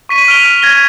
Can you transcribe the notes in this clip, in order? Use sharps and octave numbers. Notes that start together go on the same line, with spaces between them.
C#6 B6 D#7
F6 D7 D#7 F7 G7
F6
G#6 A#6 D#7 G7